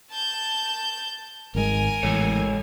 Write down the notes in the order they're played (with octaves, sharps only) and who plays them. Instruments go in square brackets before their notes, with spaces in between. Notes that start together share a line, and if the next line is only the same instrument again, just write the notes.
[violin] A5 G6
[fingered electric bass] G#1 G#2 G#3 [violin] A#4 G#5
[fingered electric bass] A1 [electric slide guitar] G#3 A4 C#5